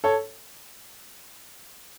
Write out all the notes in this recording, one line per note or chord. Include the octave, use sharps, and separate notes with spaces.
A4 C#5